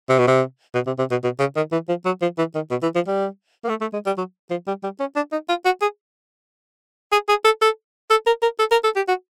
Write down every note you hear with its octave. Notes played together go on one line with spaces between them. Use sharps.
C3
B2
C3
B2
C3
C3
B2
B2
C#3
D#3
E3
F3
F#3
F3
E3
D#3
B2
E3
F3
G3
A#3
A3
A3
G#3
G3
F#3
F3
G3
G3
C#4
D4
D#4
F4
F#4
G#4
G#4
G#4
A4
A4
A4
A#4
A#4
A4
A#4
A4
G4
F#4